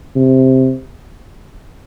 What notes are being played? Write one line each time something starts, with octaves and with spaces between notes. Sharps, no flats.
C3